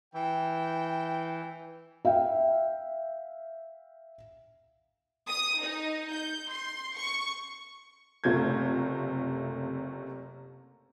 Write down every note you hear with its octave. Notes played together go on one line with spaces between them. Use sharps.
E3 G5
E5 F5 G5
D#6
D#4
G6
C6
C#6
F#1 C3 A3 F4 G6 G#6